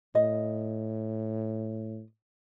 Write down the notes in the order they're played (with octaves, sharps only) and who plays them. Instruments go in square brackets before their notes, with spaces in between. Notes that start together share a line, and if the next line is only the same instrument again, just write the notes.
[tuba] A2 [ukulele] D#5